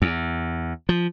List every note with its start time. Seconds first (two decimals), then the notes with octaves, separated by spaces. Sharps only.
0.02 E2
0.89 F3